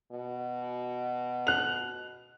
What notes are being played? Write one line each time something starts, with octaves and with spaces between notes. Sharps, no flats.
B2
F#6 F7